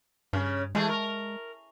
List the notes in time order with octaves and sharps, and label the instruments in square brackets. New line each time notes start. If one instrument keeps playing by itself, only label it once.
[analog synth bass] G2 [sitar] C#3 C#4
[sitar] E3 A3 G#4 [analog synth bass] G#3
[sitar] A#4